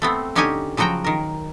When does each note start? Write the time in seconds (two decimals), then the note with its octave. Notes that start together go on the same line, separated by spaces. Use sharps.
0.02 A3 B3 C4
0.35 D3 C#4 D#4 G4 C#5 G#5
0.77 C#3 F3 F#3 F#4 G5 A#5
1.04 D#3 A#4